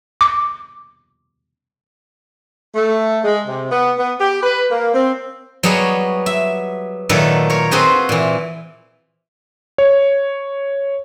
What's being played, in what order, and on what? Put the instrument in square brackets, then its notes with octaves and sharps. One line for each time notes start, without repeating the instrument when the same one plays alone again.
[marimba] D6
[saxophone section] A3
G#3
C3
B3
B3
G4
B4
A#3
C4
[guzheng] F#3 G3 B3 G#4 C#5 D#5
E5
A#2 D#3 F#3 A3 A4 B4
A#4 C#5
C4 F4 F#4 G#4 B4 C5
A#2 E3
[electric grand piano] C#5